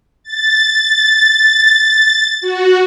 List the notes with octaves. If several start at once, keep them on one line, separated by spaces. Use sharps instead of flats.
A6
F#4